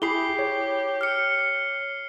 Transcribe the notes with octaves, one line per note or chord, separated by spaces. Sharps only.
E4 G4 G#4 B5 C7 G7
C#5
F6 C#7